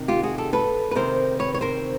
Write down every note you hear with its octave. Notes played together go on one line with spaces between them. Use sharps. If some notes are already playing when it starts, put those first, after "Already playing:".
Already playing: C3 D#3
F4 G4
F#4 G#4
G4 A4
A4 B4
B4
C3 D#3 A#4 C5
B4 C#5
C#5
A#4 C5